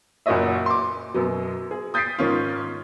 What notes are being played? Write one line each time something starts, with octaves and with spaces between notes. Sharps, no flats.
F#1 A#2 F#4 C#5 D#5 E5
C6 D6
F#2 B2 F#3
G#4
D#6 G6 A6 B6 C7 D7
G#2 D#3 C#4 F4